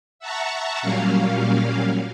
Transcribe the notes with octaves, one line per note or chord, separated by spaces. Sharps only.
E5 F#5 A5 A#5 C#6
A#2 F#3 G3 A#3 C#4 F5